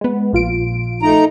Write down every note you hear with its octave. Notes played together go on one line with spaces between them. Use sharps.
G#3 B3
A#1 F4 D7
A3 D#4 A#5